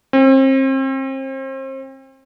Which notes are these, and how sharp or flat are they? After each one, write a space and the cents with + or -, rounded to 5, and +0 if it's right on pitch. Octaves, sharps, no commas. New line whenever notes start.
C4 +35